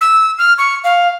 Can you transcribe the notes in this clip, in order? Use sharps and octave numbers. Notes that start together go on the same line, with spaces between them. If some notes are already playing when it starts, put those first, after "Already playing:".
E6
F6
C#6
F5